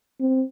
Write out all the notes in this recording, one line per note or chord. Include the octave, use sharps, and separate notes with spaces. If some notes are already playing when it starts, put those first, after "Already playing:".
C4